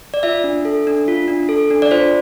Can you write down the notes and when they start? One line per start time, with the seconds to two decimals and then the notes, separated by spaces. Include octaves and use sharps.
0.14 D5
0.23 F4 E5
0.44 D4
0.65 A4
0.87 D4
1.08 F4
1.28 D4
1.49 A4
1.70 D4
1.82 D5
1.91 F4 C5